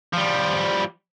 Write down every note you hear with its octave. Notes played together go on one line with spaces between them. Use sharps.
F3 G3